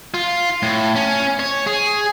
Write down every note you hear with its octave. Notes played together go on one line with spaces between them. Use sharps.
F4
A2
C#4
C#5
G#4